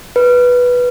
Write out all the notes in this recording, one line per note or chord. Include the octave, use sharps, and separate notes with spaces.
B4